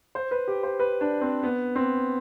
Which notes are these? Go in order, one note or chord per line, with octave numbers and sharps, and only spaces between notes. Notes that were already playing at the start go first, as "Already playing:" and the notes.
C5
B4
G4
C5
B4
D4
C4
B3
C4